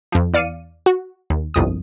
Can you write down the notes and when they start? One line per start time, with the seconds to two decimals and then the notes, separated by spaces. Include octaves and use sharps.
0.12 F2 F3
0.33 E2 D5 F5 C#7 D#7
0.86 F#4
1.30 D#2
1.54 G1 C2 F2 D#6